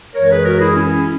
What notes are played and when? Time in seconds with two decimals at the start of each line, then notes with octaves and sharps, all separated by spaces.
0.15 F#2 E3 G#3 A#4 C#5
0.25 A#4
0.30 G#4 B4
0.44 F#4 A#4
0.60 E4 G#4
0.75 C#4 E4